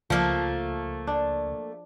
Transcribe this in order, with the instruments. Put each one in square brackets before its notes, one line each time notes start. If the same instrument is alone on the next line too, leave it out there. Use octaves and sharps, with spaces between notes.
[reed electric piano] C#2 [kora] F3 [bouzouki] A3 A#3
[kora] D4